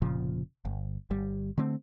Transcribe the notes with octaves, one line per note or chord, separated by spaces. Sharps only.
F1 A#2 C#3 F3
G1
G1 G3
D3 A3 C4